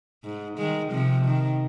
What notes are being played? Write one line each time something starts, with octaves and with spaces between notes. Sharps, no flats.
G#2
D#3 G#3
C3 F3
D#3